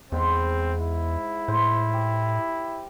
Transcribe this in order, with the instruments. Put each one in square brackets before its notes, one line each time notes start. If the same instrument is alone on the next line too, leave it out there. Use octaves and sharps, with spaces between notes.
[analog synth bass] E2 [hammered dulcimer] G#2 B5 C6 [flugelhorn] C4
[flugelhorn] E4
[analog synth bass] A2 [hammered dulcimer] C5
[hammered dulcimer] G4